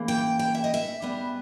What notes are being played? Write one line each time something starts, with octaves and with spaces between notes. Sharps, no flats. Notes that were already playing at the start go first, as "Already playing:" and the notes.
Already playing: C#3 E3 A#3
G5
G5
E5
D#5
E5
C#3 G3 B3